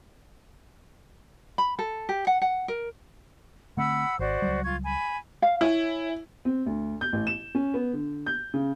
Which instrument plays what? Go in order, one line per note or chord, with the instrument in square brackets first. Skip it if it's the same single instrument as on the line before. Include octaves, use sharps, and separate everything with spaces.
[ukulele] B5
A4
G4
F#5
F#5
A#4
[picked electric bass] D3 A3 C4 [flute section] F#5 B5 E6
[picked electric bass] G#1 [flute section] F#4 C5 D5
[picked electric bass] C#2 F#3 G3
[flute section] F4 C#6 G#6
G#5 B5
[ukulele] F5
[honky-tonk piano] E4 [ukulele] C#5 G#5
[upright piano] C4
D2
G6
A1
E7
C#4
B3
D3
G6
C#3